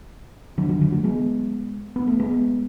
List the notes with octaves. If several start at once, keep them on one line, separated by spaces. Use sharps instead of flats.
D3 F#3
D3 F#3
D3 F#3
F#3 A3
G#3 B3
B3
A3
G#3 B3